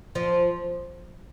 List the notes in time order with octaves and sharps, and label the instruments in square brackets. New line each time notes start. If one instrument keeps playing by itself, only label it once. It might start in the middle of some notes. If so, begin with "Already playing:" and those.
[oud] F3